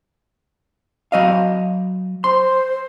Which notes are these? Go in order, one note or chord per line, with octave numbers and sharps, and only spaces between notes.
F#3 D#5 F5
C5 C6